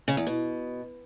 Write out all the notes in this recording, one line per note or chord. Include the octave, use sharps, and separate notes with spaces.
C#3
E2
B2